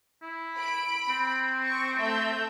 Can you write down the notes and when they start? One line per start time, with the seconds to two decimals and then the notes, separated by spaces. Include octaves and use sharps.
0.22 E4
0.57 B5 D7
1.09 C4
1.66 C#6 D7
1.97 A3 E5 G6